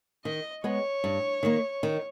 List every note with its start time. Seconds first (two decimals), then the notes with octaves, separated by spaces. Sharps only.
0.25 D#3 D#5
0.64 G#3 B3 C#5
1.04 G2
1.43 D#3 G3 A#3
1.83 D#3